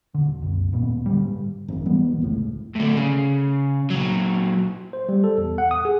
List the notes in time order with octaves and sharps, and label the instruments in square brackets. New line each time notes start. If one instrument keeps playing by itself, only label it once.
[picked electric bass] D#1 D3
C2 F#2
D#2 A#2 B3
G#2 D3 G3
[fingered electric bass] G#1 F#2
E3 G3 B3
A#1 D#2
F1 C#2 A2
[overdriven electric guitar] A2 D3
C#3
A#2 F#3
[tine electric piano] C5
G3
A4
E2
F#5
D#6
G#4